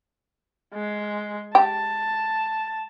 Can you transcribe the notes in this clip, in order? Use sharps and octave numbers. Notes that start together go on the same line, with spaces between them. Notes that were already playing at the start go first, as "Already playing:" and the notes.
G#3
G4 A5